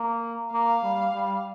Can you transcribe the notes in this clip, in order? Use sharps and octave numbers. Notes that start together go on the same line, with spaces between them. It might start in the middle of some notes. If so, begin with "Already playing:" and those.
Already playing: A#3
A#3 F5
G3
G3